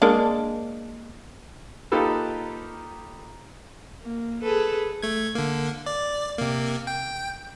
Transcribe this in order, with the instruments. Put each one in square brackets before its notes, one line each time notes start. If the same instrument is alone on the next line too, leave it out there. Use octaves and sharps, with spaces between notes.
[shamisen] G#3 A#3 D4
[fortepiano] A#3 D#4 F4 G4 A4 B4
[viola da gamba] A#3
G#4 A4 B4
[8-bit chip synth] A3 G#6
D3 A#3
D5
C3 A#3
G5